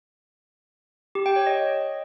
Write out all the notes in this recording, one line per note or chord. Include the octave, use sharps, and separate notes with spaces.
G4
G5
C#5
D#5